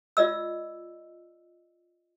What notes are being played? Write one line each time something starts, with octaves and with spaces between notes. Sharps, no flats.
F4 D5 D#5 E6